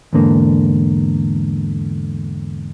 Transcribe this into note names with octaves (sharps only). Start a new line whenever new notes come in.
E2 G#2 D3 A#3